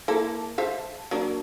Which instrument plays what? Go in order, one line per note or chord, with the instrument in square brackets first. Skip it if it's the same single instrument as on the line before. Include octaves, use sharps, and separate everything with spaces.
[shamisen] A#3 E4 A4 [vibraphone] A5
[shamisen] C5 E5 F5
F#3 A#3 D4